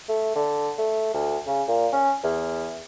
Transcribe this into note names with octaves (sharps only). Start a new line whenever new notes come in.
A3
D3
A3
D2
C#3
A#2
C#4
E2